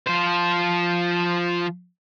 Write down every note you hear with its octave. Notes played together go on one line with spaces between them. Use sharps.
F3 C5